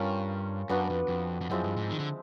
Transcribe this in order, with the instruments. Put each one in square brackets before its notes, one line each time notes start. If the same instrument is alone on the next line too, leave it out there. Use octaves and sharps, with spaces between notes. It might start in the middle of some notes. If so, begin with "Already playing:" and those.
Already playing: [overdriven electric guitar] G2 [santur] C#4 F4 A#4 C#5
[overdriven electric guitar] F#2 [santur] B3 D4 F#4 B4
[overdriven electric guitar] F2
F2
F2
[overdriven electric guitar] F#2 [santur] F3 G#3 C4 E4
[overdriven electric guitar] G2
G#2
D#3
D3